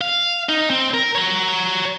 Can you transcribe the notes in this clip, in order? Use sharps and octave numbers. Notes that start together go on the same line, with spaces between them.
F5
D#4
C4
A#4
C#5 A#5